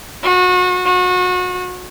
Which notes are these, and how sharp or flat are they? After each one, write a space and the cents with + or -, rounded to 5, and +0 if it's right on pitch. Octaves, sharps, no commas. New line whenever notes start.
F#4 -30
F#4 -30